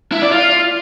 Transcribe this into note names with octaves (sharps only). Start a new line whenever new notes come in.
E4
D5
F4